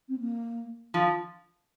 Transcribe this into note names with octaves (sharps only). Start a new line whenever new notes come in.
C4
A#3
D3 F3